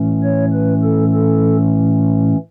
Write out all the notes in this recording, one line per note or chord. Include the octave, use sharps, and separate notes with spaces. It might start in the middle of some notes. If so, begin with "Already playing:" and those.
Already playing: A2 E3 A3 C#4
C#5
B4
A4
A4